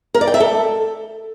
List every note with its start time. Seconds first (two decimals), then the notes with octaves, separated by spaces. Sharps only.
0.14 A#4
0.21 D5
0.27 G5
0.34 E5
0.40 A4